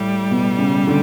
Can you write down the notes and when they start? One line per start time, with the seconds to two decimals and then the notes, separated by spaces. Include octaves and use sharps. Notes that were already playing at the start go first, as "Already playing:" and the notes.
Already playing: A2 G3
0.31 B2
0.59 C#3
0.87 D3